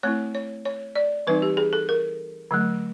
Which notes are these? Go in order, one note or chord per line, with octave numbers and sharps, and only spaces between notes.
A3 C4 E4 C#5
C#5
C#5
D5
E3 G3 C4 D#4 B4
G4
G#4
A4
A#4
D3 F#3 A3